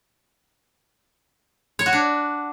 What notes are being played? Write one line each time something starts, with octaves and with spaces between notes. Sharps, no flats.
C#5
F#4
D4